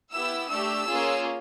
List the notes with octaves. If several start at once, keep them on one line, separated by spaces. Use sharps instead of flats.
B3 E4 G4 E6
A3 D4 G4 E6
A#3 C#4 F4 G#4